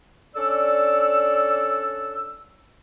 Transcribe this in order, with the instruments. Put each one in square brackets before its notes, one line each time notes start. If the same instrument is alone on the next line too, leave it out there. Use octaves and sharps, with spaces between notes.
[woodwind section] C#4 D4 A4 D5 E6